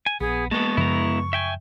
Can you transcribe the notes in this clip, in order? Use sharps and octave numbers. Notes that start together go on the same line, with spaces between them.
G#5
A#1 B3 G#4
G#3 A#3 B3 A5 C#6
F#2 C#3 F3 E4 A#5
E5 G5 G#5